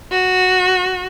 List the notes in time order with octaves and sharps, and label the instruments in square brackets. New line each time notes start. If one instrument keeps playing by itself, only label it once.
[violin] F#4